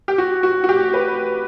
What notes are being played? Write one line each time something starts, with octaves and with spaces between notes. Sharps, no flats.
G4
F#4
F#4
F#4
G4
B4